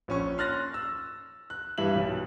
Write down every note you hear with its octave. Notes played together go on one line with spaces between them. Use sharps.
A#1 C#4 C#6
C6 F6 F#6 A6 A#6
E6
F#6
G2 E3 E5 F#7
B1